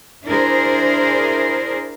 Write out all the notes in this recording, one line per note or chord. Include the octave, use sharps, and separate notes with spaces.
D4 E4 G#4 A#4 C5